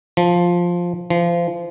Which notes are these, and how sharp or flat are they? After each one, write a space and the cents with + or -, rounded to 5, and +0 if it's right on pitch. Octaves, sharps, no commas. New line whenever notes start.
F3 +5
F3 -25